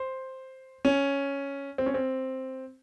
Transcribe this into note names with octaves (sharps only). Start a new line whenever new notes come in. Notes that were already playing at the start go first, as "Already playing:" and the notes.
Already playing: C5
C#4
C4
C#4
C4